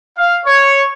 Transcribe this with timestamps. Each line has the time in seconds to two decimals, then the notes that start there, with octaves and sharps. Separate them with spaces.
0.17 F5
0.46 C#5